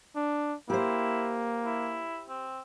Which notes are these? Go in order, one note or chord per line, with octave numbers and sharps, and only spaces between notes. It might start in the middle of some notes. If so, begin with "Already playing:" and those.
D4
A#3 E4 G4 C5
E4
C4